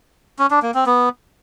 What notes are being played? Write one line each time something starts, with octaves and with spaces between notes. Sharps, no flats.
C#4
D4
A#3
C4
B3